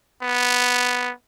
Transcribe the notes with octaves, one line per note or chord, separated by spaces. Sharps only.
B3